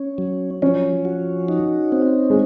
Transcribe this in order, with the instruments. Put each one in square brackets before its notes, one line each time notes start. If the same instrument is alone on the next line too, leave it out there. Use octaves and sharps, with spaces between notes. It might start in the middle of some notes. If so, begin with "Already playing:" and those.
Already playing: [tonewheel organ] C#4
F#3
[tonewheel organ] F3 [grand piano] C#4
[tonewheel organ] F#4
D#4
C4
[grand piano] G#3